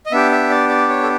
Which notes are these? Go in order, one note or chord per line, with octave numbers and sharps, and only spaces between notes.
D#5
B3 D4 G4 E5
E5
D5
D5
C#5
A4